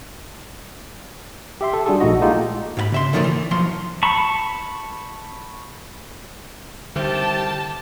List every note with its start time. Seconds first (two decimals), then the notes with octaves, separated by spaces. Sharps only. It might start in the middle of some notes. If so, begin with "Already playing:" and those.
1.61 G4 E5 C6
1.74 A4
1.86 G3 D4 F#4 G#4 A4
2.00 A#1 A3 D#4 E4 F#4 D#5
2.21 G#3 A#3 D#4 F4 G4 A4
2.77 G#2 F5 B5
2.92 C#3 E5 C6
3.13 A#2 D#3 F3 F#3 A3 D4
3.24 E3
3.51 B1 F3 F#3 C6
4.03 A5 B5 C#6
6.96 C2 D3 D#3 G4 C5 A5 G6